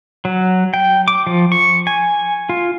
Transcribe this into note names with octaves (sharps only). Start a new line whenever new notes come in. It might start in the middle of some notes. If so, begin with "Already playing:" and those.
F#3
G5
D6
F3
C#6
G#5
F4